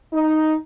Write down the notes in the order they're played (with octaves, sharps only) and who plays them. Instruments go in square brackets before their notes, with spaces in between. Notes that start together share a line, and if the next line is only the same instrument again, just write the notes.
[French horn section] D#4